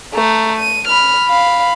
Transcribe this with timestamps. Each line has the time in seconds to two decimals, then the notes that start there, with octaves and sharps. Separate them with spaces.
0.14 A3 A#5
0.57 D#7
0.88 B5 F6
1.28 F5 B5